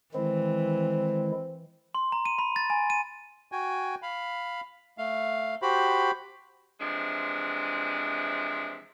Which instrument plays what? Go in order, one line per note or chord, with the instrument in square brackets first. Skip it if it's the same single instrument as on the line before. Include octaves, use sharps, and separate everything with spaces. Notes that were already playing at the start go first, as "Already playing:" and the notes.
[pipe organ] D#3 G#3 E4 [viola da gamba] E3 [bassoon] C4
[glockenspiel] C6
A#5
D#7
B5
A6
G#5
D#7
[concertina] F#4 G5 G#5
F5 B5
A3 F5
F#4 G4 C5 B5
[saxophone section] C3 E3 F3 G#3 D4